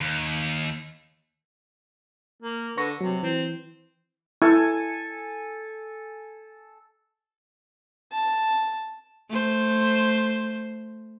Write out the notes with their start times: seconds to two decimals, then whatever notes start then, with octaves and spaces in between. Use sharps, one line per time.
0.01 D#2
2.42 A#3
2.77 D3 B4 C#6 A#6
3.00 C3 F#3
3.23 E3 C4
4.42 E4 A4 G#5
8.12 A5
9.29 A3 C5